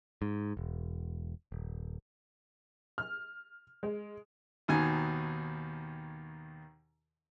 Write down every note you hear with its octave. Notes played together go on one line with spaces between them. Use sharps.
G#2
E1
D#1
F6
G#3
D#2 B2 D#3 G#5